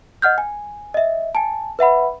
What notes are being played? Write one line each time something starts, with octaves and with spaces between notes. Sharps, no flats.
D#5 F#5 F6 G6
G#5
D#5 E5
G#5 A5
B4 E5 F#5 B5